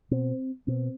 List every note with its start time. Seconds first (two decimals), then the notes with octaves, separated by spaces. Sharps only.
0.11 B2 C4
0.67 B2 C4